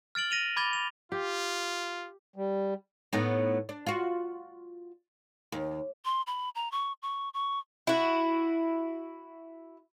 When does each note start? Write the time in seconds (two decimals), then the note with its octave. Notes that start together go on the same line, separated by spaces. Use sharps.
0.15 F6 A6 D7 F#7 G7
0.30 A#6 D#7 F7 G7
0.56 B5 D6 G#6 A6 F7 G7
0.73 F7
1.12 F4 G4
2.36 G3
3.13 A2 B3 D#4
3.69 D4
3.86 F4 F#4
5.52 D#2
6.05 C6
6.27 B5
6.55 A#5
6.72 C#6
7.02 C#6
7.34 C#6
7.87 E4 F#4